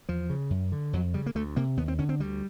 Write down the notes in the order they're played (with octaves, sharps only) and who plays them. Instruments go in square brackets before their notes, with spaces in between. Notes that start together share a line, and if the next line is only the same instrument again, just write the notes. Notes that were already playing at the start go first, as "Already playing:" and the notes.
[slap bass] E2 F3
C#3
F#2
D3
F2 F#3
C#3 G3
A#3
D2 A3
C3 A#3
D#2 B3
C4
D3 C#4
C4
D2 G3